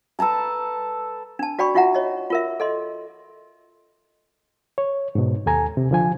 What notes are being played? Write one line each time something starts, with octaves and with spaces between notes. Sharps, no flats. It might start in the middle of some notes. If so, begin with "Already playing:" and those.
A4 B4 A5 A#5
D4 A5
F#4 D5 G5 B5 C#6
D#4 F4 F#4 E5 F#5 A#5
C#5 D#5
F4 A#4 E5
A4 D#5 C6
C#5
G#2 B2
D#2 A4 G#5 A#5
C3
D3 F3 G#5